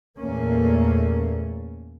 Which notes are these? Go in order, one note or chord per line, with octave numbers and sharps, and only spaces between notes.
E2 A#2 A3 A#3 C#4